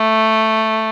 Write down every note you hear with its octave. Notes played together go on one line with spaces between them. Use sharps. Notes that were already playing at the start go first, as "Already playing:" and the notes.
Already playing: A3